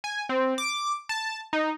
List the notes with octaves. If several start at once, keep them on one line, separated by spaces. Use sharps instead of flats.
G#5
C4
D6
A5
D#4